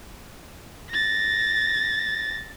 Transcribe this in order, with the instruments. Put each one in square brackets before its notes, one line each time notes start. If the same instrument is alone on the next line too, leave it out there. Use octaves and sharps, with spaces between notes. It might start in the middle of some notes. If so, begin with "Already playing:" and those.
[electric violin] A6 A#6